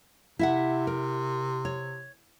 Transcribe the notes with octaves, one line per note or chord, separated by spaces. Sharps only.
C3 E4 E5 F#5
A#4
C#5